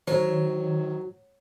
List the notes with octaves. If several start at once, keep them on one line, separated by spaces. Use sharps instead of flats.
D#3 F#3 A#4 C5 C#5